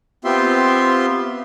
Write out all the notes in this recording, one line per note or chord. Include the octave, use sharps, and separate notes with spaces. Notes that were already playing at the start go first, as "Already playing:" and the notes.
B3 C4 F4 G4 E5 C6